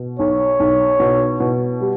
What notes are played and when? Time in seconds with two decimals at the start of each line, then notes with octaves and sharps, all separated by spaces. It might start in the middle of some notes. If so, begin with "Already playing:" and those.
Already playing: B2
0.19 B1 C#5
0.60 B1
1.00 B2
1.40 B2
1.81 G3